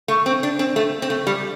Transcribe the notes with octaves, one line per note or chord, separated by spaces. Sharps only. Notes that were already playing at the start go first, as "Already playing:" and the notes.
A3
C4
D4
C4
A3
C4
A3
G3